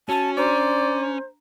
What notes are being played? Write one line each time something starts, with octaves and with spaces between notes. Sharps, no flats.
C#4 F#4 A5
D4 C5 D5 A#5 C6